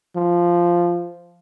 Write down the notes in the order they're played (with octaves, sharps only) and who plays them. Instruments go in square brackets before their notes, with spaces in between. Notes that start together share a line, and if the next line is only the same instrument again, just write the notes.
[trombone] F3